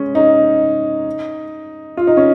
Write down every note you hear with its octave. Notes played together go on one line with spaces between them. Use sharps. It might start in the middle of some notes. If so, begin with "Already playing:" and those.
Already playing: G#3 C#4
D#4
F4
D#4
C#4